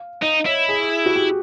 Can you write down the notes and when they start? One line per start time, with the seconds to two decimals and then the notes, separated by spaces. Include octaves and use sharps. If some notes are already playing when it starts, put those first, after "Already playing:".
Already playing: F5
0.22 D#4 D#5
0.46 E4 C#5
0.69 G#4
1.06 F#4
1.16 G4